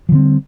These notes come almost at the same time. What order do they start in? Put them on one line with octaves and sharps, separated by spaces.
F3 D3 C4 G3